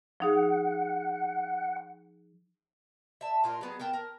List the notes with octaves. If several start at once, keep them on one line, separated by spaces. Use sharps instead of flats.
F3 D#4 G#4 F#5
E5 A5
A#2 F4 A#4
F#3 B3 G#4
B3 A#4 G5 A5
A#4